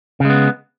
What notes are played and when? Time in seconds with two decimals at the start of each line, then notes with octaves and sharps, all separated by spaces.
0.20 C#3
0.25 G#3
0.30 B3